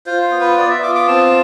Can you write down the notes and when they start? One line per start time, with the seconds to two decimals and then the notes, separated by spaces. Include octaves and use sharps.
0.06 F4 C5
0.23 C5
0.31 B3
0.40 B4
0.57 B3 D5
0.70 E5
0.83 F4 D6
0.95 D6
1.08 C4 A5